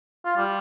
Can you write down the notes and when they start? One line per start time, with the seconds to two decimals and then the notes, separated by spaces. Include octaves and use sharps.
0.25 F4
0.36 G3